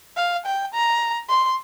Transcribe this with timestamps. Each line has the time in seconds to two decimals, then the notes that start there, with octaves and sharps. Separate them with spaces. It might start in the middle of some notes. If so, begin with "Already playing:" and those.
0.17 F5
0.46 G5
0.74 A#5
1.29 C6